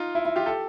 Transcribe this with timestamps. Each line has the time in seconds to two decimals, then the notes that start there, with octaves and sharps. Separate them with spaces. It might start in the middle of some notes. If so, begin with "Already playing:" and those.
Already playing: D#4 F4
0.15 E4
0.25 E4
0.36 F4 G4
0.46 G4 A4